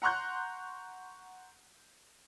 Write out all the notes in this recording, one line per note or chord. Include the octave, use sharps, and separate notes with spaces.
F#5 A#5 C6 C#6 F#6 G6